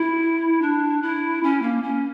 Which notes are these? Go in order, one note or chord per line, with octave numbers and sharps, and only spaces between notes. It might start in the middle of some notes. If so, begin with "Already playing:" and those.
Already playing: E4
D4
E4
C#4
A#3
C#4